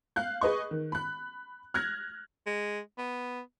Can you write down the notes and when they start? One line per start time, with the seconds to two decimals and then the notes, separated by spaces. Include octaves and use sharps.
0.16 F5 F#6 G6
0.41 G#4 B4 D#5 C#6
0.71 D#3
0.92 B5 F#6
1.74 F6 F#6 G#6 A#6
2.46 G#3
2.98 B3